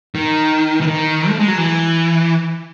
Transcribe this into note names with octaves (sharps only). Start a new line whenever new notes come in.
D#3
E3
D#3
A3
G#3
F#3
E3